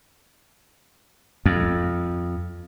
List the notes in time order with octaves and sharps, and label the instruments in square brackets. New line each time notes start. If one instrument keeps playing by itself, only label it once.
[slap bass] F2